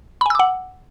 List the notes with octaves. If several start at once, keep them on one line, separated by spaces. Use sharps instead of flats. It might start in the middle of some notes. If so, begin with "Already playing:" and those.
F#5 G#5 B5 D6 E6